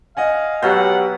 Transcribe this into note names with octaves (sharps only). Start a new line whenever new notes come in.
D#5 F5 F#5 G#5
B2 F#3 G4 F#5 E6 F6 G6